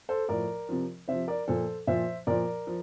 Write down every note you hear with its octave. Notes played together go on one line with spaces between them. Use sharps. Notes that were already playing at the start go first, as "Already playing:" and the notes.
A4 C5
A2 F3 A#4 D5
C3 F3
C3 F3 C5 E5
A#4 D5
A#2 F3 A4 C5
A#2 F3 C5 E5
A#2 F3 A#4 D5
F3